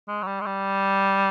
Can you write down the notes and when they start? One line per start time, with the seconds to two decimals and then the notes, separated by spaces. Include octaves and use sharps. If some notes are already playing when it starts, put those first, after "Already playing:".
0.08 G#3
0.23 F#3
0.27 G3
0.41 G#3
0.46 G3